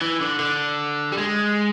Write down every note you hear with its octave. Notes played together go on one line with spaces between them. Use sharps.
E3
D3
D3
G3
G#3